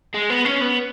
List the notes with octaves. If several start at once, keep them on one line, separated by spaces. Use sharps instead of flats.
G#3
B3
C#4
B3